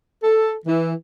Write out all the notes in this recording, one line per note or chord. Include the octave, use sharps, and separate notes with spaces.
A4
E3